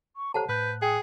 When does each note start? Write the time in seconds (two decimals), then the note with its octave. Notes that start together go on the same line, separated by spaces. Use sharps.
0.16 C#6
0.34 G4 A4 C5 C#5 F#5 A5 A#5
0.49 A2 B4 F#6 G6
0.82 G#4 G5 D#6